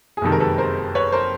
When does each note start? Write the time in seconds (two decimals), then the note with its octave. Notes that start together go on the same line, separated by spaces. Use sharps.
0.17 G#4
0.21 F#1 F2 C3 D#3 G#3 A4
0.32 A#4
0.40 A4 B4
0.58 A#4 C5
0.95 B4 C#5
1.12 A#4 C5